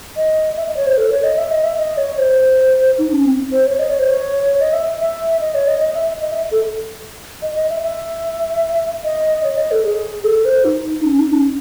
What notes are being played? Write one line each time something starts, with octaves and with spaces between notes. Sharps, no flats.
D#5
E5
D#5
C#5
C5
A4
C#5
D#5
E5
D#5
E5
D#5
C#5
C5
D#4
C#4
C4
C5
C#5
D#5
C#5
C5
C#5
D#5
E5
E5
D#5
C#5
D#5
D#5
E5
D#5
E5
A4
D#5
D#5
E5
E5
D#5
C#5
D#5
A4
G#4
A4
C5
D#4
C#4
D#4
C#4